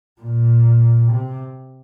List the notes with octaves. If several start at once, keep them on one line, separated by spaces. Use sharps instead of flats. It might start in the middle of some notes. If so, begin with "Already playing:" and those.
A#2
C3